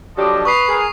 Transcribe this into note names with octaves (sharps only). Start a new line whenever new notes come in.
F3 F#3 D4 G4 A4 D#5
B4 C#6 D#6 C7
G#4 A#4